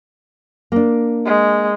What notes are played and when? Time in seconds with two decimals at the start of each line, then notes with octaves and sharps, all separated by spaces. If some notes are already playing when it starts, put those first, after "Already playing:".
0.72 A#3 D4
1.26 G#3